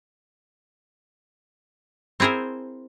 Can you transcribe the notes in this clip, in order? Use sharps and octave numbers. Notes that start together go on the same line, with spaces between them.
C4 E4 G#4 A#4 C5